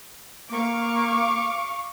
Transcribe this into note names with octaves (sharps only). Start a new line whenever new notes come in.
A#3 F5 C#6 D6